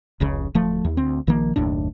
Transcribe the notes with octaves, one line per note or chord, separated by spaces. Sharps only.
F1 C#2 C#3
D1 F3 A3
D#2
D2 C4
A#1 D#3 F3 A#3
F#1 D#2 A2 D4